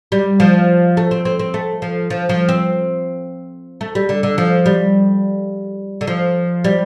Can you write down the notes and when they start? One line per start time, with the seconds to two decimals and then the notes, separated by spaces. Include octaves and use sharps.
0.12 G3
0.40 F3
0.97 A3
1.11 C4
1.25 C4
1.39 C4
1.54 A3
1.82 F3
2.10 F3
2.29 F3
2.49 C4
3.81 A3
3.95 G3
4.09 D3
4.23 D3
4.38 F3
4.66 G3
6.01 D3
6.07 F3
6.64 G3